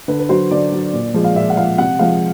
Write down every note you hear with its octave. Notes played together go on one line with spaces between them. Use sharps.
D3 B4
B4
F#3 C5
D3 D5
F#3
A#2
F3 G#3
F5
A#2 E5
F#5
F3 G#3 F5
C3 F#5
F3 G#3 F5